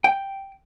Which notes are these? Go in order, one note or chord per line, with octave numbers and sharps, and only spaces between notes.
G5